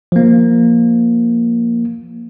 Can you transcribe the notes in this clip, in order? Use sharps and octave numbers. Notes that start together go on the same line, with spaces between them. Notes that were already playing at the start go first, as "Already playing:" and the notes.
F3 A#3